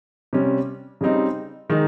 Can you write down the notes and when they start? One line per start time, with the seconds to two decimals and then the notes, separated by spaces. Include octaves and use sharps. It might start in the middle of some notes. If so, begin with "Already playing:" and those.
0.33 C3 G3 C#4
1.01 C#3 G3 C4 D#4
1.70 D#3 G#3 D#4